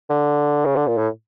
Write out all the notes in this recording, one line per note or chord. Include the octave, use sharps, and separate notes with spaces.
D3
C#3
D3
A#2
A2